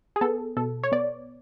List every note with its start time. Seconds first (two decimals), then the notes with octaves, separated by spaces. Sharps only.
0.16 G#4
0.21 B3 A4
0.57 B2 A4
0.83 C#5
0.92 B3 D5